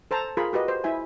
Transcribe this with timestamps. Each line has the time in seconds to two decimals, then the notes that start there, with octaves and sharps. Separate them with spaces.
0.11 A4 C5 A5 A#5
0.37 F4 G#4 A#4 B5 C6
0.53 F#4 G4 B4 D#5
0.68 C5
0.84 E4 E5 G#5